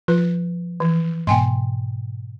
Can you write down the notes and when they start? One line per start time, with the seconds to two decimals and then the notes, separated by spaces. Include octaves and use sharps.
0.08 F3 B4
0.80 E3
1.27 G#2 B2 G5 G#5 C6